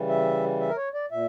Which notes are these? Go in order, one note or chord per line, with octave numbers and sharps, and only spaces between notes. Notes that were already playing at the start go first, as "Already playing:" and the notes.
Already playing: C#3 E3 G3
E5
E5
A#4
C#5
D5
A#2 E5